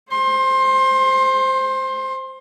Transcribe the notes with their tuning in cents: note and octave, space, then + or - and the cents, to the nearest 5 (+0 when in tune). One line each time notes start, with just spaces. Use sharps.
C5 +0 C6 +25